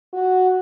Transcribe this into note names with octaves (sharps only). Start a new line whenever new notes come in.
F#4